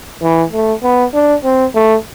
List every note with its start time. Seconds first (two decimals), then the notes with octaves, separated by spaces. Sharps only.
0.22 E3
0.53 A3
0.84 B3
1.14 D4
1.44 C4
1.75 A3